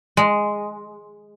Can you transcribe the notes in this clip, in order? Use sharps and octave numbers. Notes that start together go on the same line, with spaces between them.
G#3